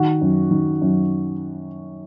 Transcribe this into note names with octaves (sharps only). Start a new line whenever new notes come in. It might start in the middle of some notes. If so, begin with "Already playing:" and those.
Already playing: D#3 F#4
F#2
D#3
F#2